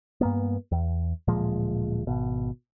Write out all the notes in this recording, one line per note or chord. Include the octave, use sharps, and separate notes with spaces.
G2 A#3 B3
E2
D1 A#2 F3 G#3
G#1 B2